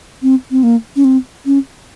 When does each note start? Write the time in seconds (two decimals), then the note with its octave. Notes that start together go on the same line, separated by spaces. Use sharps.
0.22 C4
0.51 C4
0.63 A#3
0.96 C#4
1.04 C4
1.46 C#4